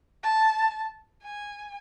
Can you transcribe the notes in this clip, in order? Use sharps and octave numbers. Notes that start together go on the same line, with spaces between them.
A5
G#5